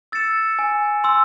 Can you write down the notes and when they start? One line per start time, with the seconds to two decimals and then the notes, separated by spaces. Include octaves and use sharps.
0.12 E6 A6 C#7 E7
0.59 G#5
1.04 C6 E6